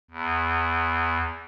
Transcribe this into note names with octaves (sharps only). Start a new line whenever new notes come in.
E2